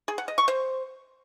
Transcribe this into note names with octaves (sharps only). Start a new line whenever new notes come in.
G#4
F#5
D#5
C#6
C5